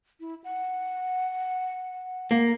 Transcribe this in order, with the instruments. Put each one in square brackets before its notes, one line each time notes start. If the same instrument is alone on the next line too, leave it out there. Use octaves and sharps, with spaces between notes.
[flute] E4
F#5
[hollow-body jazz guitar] A#3